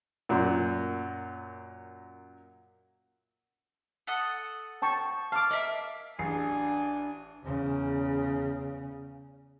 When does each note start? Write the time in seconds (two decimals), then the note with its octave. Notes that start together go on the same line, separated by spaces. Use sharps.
0.29 F#2 A#2
4.07 A4 F#5 D#6
4.82 G5 A5 C#6
5.32 F5 A5 D6
5.51 A#3 D#5 E5
6.19 A1 D4 G#4 G#5 C7
7.45 E2 C#3